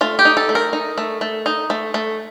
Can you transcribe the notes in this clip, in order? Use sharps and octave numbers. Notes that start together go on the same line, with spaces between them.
A3 F4
G4
D#4
A4
A3
A#4
D#4
A3
A3
D#4
A3
A3